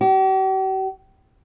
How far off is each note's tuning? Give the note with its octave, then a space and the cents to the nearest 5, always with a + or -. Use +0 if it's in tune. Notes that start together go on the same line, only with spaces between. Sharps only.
G4 -45